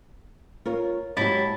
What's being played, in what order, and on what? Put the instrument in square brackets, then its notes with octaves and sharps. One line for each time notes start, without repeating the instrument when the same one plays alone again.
[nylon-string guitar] F4 A#4 C#5
[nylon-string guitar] G#2 F#3 G4 [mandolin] E4 A5